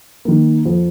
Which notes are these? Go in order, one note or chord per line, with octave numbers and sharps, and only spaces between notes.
D#3 A#3
F2